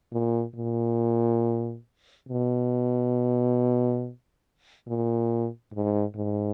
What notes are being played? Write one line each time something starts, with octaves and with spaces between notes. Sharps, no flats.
A#2
A#2
B2
A#2
G#2
G#2